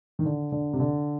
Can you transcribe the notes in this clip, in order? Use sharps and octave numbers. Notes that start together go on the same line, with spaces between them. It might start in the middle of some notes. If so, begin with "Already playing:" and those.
D#3
D3
D3
C3
D3